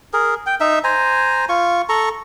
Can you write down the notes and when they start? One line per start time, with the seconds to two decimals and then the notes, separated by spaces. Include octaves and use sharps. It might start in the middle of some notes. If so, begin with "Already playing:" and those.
0.13 G#4 A#4
0.46 G5
0.60 D#4 E5
0.84 C5 G#5 A#5
1.49 F4 C#6
1.89 A4 A#5 C#6